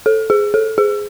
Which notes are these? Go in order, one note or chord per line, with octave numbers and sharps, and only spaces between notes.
A4
G#4
A4
G#4